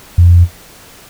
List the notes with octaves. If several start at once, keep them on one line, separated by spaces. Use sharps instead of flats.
F2